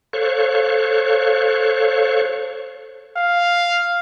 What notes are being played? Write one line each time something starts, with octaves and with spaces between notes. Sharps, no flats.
A4 C5 C#5 F5 C#6 F#6
F5